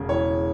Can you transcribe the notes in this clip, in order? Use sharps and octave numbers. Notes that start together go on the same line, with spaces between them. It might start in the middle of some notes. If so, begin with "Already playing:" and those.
Already playing: E1 C#3
E3 C#5